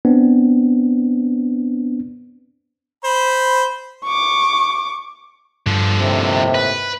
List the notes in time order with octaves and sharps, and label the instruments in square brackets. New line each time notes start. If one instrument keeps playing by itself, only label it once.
[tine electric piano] B3 C4 D4
[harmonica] C5 B5
[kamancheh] C#6 D6
[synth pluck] G2 [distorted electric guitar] D3 F3
[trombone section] D#2 A2 C3
[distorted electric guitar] B4